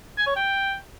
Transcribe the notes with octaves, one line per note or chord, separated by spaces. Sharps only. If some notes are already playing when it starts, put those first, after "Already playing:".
G#5
C#5
G5